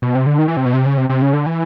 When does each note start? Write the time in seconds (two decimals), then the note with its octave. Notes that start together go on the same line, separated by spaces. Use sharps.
0.02 B2
0.15 C3
0.26 D3
0.38 D#3
0.48 E3
0.57 C3
0.66 B2
0.74 C3
0.86 C#3
0.98 C3
1.09 C3
1.22 C#3
1.33 D3
1.46 E3